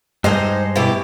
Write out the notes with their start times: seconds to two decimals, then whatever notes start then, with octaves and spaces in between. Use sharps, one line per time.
0.24 G2 G#3 D#4 C5 D#5
0.76 B2 E4 G4